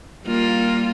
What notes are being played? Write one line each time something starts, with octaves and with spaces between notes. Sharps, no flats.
G3 A#3 F4